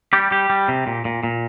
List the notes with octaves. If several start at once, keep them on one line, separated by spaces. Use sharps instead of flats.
G3 G4
G3 G4
G3
C3
A#2
A#2
A#2